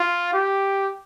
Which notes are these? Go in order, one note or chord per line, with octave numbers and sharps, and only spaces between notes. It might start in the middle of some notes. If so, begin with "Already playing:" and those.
Already playing: F4
G4